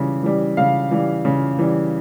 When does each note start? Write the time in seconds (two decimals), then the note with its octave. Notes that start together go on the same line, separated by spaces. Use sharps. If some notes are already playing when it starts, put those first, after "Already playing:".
Already playing: C#3 E3 G3
0.23 E3 G3
0.57 C#3 F5
0.91 E3 G3
1.25 C#3
1.59 E3 G3